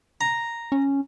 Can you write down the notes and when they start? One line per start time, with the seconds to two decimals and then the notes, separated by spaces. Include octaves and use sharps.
0.21 A#5
0.72 C#4